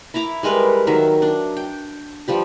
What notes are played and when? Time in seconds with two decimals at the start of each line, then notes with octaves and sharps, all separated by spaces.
0.14 E4 E5 A#5 D6
0.43 G3 G#3 A#4 B4
0.87 D#3 F#3 E5
1.22 D4
1.57 G5
2.28 F3 G3 G4